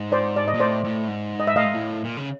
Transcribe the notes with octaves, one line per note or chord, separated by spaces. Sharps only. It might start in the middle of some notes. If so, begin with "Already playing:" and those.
Already playing: G#2
C5 D5
D5
D#5
A#2
A2 C5 D5
A2
G#2
D#5
E5
A2 D#5 F5
G#2
A2
A#2
C#3